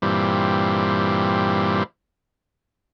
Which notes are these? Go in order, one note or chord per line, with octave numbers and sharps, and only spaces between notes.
G2 A#2 E3 G3 C4